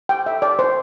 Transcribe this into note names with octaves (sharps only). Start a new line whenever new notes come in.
G5
E5
D5
C5